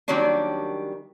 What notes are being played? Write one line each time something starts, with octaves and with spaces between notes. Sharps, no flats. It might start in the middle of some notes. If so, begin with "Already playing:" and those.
D#3 F#3 G3 A#3 C#4 D4